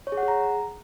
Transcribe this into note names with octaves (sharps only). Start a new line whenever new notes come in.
C#5
G#4
F#5
G#4
A#5